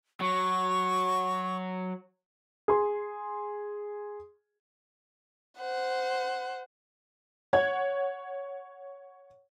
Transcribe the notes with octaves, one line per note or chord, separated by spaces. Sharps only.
F#3 C#6
G#4 C6
C5 F#5
C#5 F#5 G#6